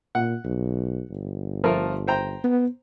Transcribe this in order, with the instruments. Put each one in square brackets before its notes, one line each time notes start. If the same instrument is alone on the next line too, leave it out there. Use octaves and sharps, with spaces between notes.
[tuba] A#2 [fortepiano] F#5
[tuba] B1
G1
[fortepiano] F3 A3 A#4
C5 G5 A#5
[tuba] B3